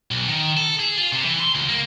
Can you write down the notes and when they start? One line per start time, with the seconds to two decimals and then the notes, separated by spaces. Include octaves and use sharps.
0.11 B1
0.28 D#3
0.57 A4
0.79 G#4
0.98 F4
1.12 C3
1.25 E3
1.40 C6
1.55 C#2
1.69 A#3